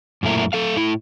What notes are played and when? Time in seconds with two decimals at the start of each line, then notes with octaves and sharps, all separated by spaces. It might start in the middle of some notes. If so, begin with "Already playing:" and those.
0.23 F#2 A#2 A3 E4 A#4
0.53 A3 A4 F5
0.76 A2 E4